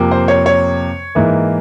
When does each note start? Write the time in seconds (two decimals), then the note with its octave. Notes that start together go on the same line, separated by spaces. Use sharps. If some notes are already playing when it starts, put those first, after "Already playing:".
Already playing: F2 C3 F3 A#3
0.11 C5
0.28 C#5
0.46 C#5
1.15 G#2 E3 A#3 E5